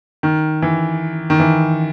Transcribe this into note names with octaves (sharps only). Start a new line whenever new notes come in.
D#3
E3
D#3
E3